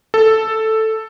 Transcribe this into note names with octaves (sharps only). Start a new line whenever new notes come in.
A4